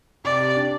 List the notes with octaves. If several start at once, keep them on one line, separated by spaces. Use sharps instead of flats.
C3 D5
G4
D4